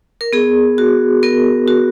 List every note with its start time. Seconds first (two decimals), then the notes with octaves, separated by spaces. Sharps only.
0.21 A#4
0.33 B3 G#4
0.78 F#4
1.23 B3 A#4
1.68 F#4